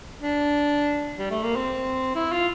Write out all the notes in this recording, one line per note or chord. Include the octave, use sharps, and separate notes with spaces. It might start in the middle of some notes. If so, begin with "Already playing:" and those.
D4
G3
A3
A#3
C4
E4
F4